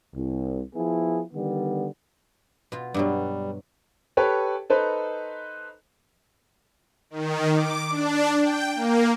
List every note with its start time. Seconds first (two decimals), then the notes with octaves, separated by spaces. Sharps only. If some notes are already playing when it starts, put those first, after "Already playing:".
0.14 C2
0.75 F3 B3 E4 G#4
1.33 D3 D#3 G3 B3
2.72 B2 F4
2.94 G2 B2 F#3 G3
4.17 G4 A4 B4 C#5
4.70 D#4 A4 B4 C5
7.10 D#3
7.52 D6
7.90 D4
8.41 G5
8.75 A#3